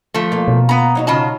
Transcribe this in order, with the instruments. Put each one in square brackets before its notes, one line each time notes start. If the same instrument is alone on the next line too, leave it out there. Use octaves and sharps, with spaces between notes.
[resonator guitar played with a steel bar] F3 A3
[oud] A#3 F4
[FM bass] B2
[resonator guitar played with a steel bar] B3 A#5
[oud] F#3 D#4 F#4
[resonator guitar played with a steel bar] C#3 F4 A5